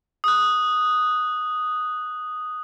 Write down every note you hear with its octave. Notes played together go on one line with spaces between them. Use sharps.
D#6 F#6